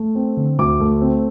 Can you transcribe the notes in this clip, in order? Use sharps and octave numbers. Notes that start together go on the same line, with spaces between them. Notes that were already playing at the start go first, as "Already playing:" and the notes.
Already playing: A3
C4
D3
D2 D6
A3
C4